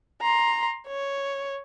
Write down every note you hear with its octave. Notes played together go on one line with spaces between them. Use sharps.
A#5 C6
C#5